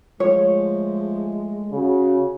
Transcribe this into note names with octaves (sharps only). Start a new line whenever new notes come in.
F3 G#3 A3 C#5
C#3 F#4